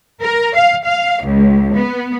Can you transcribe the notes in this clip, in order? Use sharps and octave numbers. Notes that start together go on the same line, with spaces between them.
A#4
F5
F5
C#2
B3